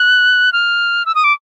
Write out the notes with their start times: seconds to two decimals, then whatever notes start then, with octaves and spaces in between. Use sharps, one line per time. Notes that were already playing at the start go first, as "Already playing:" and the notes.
Already playing: F#6
0.53 F6
1.06 E6
1.15 D#6
1.24 D6